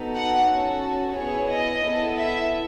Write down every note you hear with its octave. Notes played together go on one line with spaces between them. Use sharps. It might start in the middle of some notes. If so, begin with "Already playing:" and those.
Already playing: B3 D#4 F#4 A4
F#5
C#4 F#4 A4
B3 E4 G#4 C#5
D#5
B3 E4 A4
E5